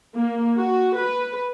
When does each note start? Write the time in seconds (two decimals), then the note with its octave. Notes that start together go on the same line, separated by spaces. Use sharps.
0.15 A#3
0.58 F#4
0.99 B4